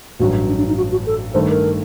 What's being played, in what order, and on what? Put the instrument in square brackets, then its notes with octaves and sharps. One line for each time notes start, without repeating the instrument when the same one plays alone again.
[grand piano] A1 G2 F#3 [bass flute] F#4
[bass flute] D4
D4
D#4
F#4
F#4
A4
[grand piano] G2 D#3 A3 [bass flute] C5
[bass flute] A#4